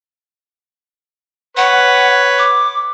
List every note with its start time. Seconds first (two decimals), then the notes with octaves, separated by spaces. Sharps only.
1.57 B4 C#5 F#5
2.39 D6